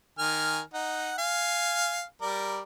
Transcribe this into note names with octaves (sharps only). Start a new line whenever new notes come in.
D#3 G#5 F6
D#4 F#5
F5 G#5
G3 A#4 D5